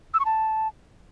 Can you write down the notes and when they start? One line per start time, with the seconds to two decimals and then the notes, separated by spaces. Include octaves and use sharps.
0.14 E6
0.20 C#6
0.25 A5